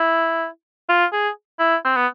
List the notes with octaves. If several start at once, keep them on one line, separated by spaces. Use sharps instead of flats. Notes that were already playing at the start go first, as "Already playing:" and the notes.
Already playing: E4
F4
G#4
E4
C4
B3